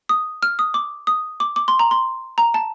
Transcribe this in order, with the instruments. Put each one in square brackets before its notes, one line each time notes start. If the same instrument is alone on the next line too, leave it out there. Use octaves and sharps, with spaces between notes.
[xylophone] D#6
F6
D#6
D6
D#6
D6
D6
C6
A#5
C6
A#5
A5